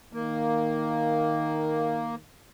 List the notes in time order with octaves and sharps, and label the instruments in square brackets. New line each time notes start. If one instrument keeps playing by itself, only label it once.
[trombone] D#3 [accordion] A#3